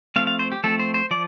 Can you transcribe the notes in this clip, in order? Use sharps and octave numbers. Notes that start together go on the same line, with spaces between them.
F3 A3 C4 F5
F5
C5
G4
F3 A3 C4 A4
C5
C5
F3 D5